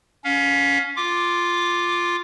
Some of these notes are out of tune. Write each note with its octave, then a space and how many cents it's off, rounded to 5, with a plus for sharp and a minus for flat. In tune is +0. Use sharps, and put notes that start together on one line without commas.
C#4 +20 F5 +30
F4 +0 D6 +0